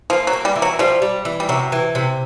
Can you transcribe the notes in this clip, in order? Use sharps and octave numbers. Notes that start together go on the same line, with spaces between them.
F3 A#3
F#3
A#3
G3
E3
F#3
F3 G3
G3
E3
G3
C3 F#3
E3
C3